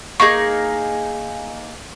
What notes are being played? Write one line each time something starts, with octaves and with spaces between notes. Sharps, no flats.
A#3 D#4 G#4 C#6